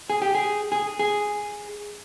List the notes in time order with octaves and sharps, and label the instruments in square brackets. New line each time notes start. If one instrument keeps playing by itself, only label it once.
[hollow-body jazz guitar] G#4
G4
G#4
G#4
G#4